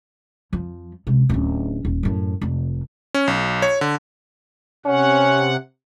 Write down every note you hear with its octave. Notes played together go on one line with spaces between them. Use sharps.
F2 F3
C#2 C3
D1 C#4
D#1
F#2 A2
F1
C#4
B1
C#5
D3
C3 C#4 F#5